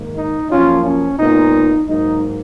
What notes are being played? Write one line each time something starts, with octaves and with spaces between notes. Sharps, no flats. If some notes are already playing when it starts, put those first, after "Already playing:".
Already playing: G#2 D#3 A#3
D#4
F#2 F3 A#3 C#4 F4
C#4
A#2 G#3 B3 D#4
G#2 F#3 A#3 D#4